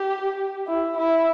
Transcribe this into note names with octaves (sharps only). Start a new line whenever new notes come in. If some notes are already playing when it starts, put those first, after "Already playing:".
Already playing: G4
E4
E4